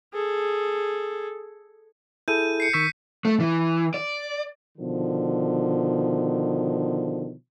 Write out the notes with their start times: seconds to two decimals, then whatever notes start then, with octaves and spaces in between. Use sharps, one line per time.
0.13 G#4 A4
2.28 E4 G#4 A4 G6 D#7
2.60 C7 C#7
2.73 D#3 C#6 E6 B6
3.25 A3
3.40 E3
3.94 D5
4.78 B2 D3 D#3 F3